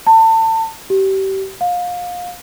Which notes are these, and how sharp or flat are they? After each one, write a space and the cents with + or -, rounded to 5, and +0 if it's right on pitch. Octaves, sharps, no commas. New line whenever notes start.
A5 +30
G4 -30
F5 +25